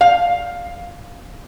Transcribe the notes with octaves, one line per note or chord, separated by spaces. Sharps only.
F5